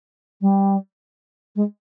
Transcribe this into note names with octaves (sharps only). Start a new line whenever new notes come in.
G3
G#3